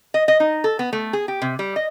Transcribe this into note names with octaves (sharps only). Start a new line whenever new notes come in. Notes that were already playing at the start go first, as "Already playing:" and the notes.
D#5
D#5
D#4
A4
B3
A3
G#4
G4
C3
G3
D#5